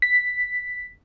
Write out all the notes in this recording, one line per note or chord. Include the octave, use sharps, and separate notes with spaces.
B6